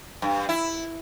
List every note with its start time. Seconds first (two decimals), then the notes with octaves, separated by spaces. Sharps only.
0.22 G2
0.49 E4